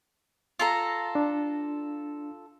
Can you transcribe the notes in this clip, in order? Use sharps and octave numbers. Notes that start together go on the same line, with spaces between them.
F4 A4 A#5
D4